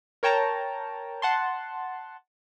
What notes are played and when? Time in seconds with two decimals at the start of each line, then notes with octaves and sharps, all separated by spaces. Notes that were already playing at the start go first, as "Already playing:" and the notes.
0.23 A#4 C#5 G5 A5 A#5
1.22 F#5 A5 C6